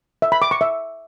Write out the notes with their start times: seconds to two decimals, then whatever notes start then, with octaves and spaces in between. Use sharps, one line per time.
0.22 E5
0.32 B5
0.42 D6
0.51 C#6
0.61 E5